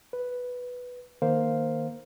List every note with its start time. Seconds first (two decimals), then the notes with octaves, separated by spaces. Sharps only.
0.13 B4
1.22 D#3 A#3 A#4 C5 F5